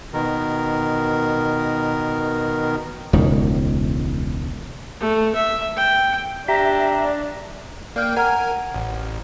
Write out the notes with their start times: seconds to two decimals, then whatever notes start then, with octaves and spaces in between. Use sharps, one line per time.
0.13 B2 D#3 A#4
3.13 E1 C#2 D#3
5.01 A3
5.35 E5
5.76 G5
6.48 D4 G4 E5 A#5
7.96 A#3 D5 G5 F6
8.17 A#4 F#5 G#5 A#5 F6
8.74 A1